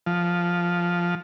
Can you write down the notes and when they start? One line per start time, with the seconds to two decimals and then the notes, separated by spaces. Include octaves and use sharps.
0.06 F3